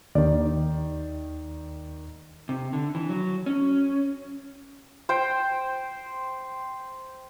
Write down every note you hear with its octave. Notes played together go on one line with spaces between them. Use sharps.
D#2 D#3 D5
C3
D3
E3
F#3
C#4
C5 G5